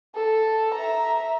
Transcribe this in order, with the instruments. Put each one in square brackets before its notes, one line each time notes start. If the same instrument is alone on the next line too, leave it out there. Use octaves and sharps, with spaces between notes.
[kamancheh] A4
E5 A#5